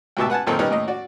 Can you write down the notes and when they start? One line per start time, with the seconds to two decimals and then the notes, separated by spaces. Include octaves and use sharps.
0.17 D2 G#2 B2 G4 E5 A5
0.30 B4 F#5 G#5 A5
0.47 A#1 F#2 D#3 C4 A4 A#4
0.59 G3 C#4 D#4 A#4 B4 C#5
0.70 D#2 A2 D#5
0.88 F#4 D5